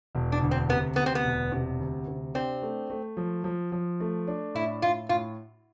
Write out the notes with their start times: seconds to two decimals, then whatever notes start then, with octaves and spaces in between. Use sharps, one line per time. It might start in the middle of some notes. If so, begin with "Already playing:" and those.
0.15 E1
0.32 D4
0.41 D2
0.51 C4
0.69 C3 B3
0.96 D2 B3
1.06 C4
1.15 B3
1.25 E1
1.52 C3
1.79 D2
2.07 C3
2.34 C4 D4
2.62 A3
2.90 A3
3.17 F3
3.44 F3
3.72 F3
4.00 A3
4.27 D4
4.55 A2 E4
4.82 A2 F4
5.09 A2 F4